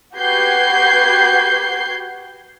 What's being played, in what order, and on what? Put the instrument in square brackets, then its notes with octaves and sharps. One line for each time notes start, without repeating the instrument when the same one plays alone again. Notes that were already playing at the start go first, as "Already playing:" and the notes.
[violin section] F#4 G4 B4 G6 G#6 C7